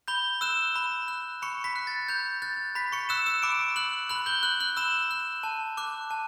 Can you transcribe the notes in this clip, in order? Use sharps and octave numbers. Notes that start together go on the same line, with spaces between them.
B5 G6 G7
E6 F#6 E7
B5
F#6
B5 C#6 C#7
B5 B6
F#6
A6
B5 G6
F#6 A6
B5 B6
C#6 C#7
E6 F#6 E7
E6 E7
B5 D6 D7
F#6 F#7
B5 F#6 F#7
G6 G7
F#6 F#7
F#6 F#7
B5 E6 E7
F#6
A5
D6 F#6
A5